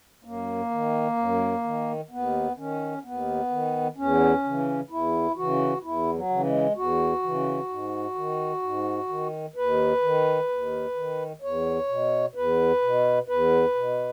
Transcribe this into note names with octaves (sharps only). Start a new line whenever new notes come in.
F#2 A#3
D#3
F#2
D#3
D#2 B3
D#3 C#4
D#2 B3
D#3
E2 C#4
C#3 E3
E2 E4
C#3 E3 F#4
E2 E4
F#3
C#3 E3
G#3
E2 F#4
C#3 E3
G#2
D#3
G#2
D#3
D#2 B4
D#3
D#2
D#3
E2 C#5
B2
E2 B4
B2
E2 B4
B2